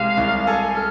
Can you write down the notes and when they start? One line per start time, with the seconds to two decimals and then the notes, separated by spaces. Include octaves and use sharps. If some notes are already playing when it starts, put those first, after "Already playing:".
Already playing: C2 C3 G#3 F5
0.17 C2
0.46 A4 G#5
0.75 A4 F6